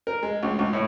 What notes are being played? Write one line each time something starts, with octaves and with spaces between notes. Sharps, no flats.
A#4
G#3
C#2
C#2
A2